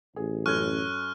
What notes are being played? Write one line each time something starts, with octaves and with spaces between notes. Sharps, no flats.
A1 G#4
F#2 A4 C#6 F6 F#6 G#6